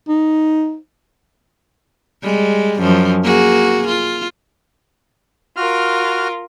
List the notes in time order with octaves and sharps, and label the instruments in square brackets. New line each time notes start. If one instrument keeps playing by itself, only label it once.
[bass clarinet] D#4
[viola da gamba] G3 G#3
F#2 F3
A#3 F#4 G#4
F4
[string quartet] F4 A#4 [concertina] F#4 F6